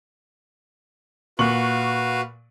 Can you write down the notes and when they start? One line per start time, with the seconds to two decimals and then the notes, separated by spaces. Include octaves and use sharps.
1.39 A#2 F#4 B4 F5 C#6 F#7